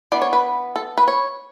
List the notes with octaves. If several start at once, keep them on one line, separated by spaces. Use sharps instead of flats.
E3 B3 D4 D5
C#5
B4
A4
B4
C#5